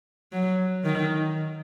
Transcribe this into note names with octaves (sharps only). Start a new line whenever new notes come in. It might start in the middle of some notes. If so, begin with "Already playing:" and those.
F#3
D#3